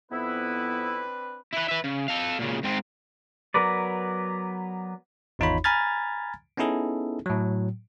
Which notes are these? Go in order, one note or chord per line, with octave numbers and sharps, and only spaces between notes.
F2 B3 C4 D4 E4 B4
E4 B4
B4 E5
C#3
A4 F5
A#2 C#3
G#2 C4
F#3 B3 A#4 B4 D5
G#1 E2 D#4 F4 C#5 B5
G#5 A#5 B5 F6 G#6 A6
B3 C#4 D#4 E4 G#4 A4
A2 F#3